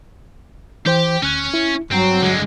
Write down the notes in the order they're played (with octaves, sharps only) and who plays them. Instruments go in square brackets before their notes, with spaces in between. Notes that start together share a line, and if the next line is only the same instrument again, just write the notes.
[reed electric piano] E3 C5 G5 [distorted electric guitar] G4
[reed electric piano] D2 F#6 [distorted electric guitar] C#4
[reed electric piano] E4
[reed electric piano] G2 [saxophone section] F#3 [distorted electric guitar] C4
[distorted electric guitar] D3 G#3